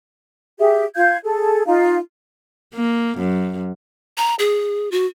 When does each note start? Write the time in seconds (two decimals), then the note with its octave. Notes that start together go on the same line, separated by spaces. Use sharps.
0.59 G4 G#4 E5
0.95 F4 F5 G6 G#6
1.24 G#4 A4
1.66 D#4 F4 F5
2.74 A#3
3.18 F#2
4.17 A#5
4.39 G#4
4.92 F#4